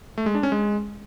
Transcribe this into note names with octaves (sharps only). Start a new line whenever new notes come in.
A3
G#3
D4
C#4
G#3